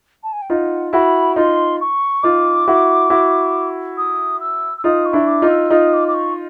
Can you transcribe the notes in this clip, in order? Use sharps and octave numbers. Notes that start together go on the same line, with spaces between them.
A5
G#5
G5
D#4 F4 F#5
E4 F#4 B5
D#4 F4 C6
C#6
D#4 F4 D6
E4 F#4
E4 F#4
D#6
E6
E6
D#4 F4 D#6
C#6
D4 E4
D6
D#4 F4
E6
D#4 F4 D#6
D6
D6
C#6